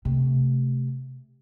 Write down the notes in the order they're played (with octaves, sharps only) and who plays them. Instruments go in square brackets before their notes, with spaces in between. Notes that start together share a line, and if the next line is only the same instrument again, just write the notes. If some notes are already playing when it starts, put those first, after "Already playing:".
[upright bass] C3 A3